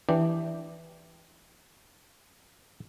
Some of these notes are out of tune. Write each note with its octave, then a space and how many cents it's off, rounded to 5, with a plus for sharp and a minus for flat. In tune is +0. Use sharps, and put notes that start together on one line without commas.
E3 +0 D4 +0 G4 +0